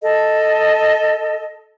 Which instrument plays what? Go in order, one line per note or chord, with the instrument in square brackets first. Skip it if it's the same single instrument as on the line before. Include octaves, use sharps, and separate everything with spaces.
[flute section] A4 D#5